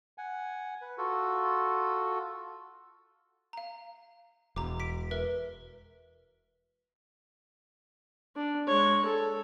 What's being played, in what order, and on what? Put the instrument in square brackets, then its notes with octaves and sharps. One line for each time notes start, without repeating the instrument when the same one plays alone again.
[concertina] F#5 G#5
B4
F4 F#4 A4
[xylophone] F5 A#5
[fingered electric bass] E1 [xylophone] A#5 D6
[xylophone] B6 D7
A#4 B4 E5
[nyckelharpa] D4
G#3 C#5
A4